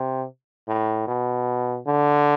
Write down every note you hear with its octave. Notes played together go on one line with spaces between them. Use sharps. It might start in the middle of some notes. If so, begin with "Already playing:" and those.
Already playing: C3
A2
B2
D3